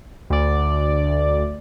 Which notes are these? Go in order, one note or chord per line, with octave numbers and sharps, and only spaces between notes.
D2 D5